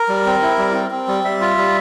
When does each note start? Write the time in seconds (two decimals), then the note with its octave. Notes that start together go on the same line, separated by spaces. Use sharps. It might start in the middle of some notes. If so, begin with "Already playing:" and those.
Already playing: A#4
0.09 G3
0.26 C4
0.42 E4
0.58 G3
0.75 C4
0.91 C4
1.08 G3
1.24 G3 E5
1.41 F4
1.57 G3